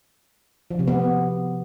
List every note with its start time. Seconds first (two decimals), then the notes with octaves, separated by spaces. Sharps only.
0.71 F3
0.79 C3
0.88 B3